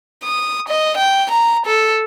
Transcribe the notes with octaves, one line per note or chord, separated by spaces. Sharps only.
D#6
D#5
G5
A#5
A4